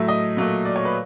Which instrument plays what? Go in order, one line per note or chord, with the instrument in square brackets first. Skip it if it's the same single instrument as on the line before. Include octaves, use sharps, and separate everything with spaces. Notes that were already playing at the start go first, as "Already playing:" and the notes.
Already playing: [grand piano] A2 F#3 A3 E5
D#5
A#2 F#3 A3
D5
C#5
B4